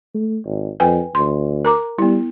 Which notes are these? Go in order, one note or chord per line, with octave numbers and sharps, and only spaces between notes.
A3
G#1
F2 B4 G5 G#5
D2 C6
A#4 A#5 D6
G3 B3 E4